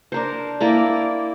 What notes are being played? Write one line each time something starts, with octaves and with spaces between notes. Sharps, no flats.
D4 A#4 C5
A#3 E4 A#4 D5